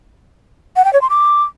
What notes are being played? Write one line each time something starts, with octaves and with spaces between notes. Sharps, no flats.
F#5
G5
C#5
C6
D6